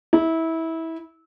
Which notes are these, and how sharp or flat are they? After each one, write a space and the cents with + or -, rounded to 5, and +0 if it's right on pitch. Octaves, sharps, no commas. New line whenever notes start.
E4 -20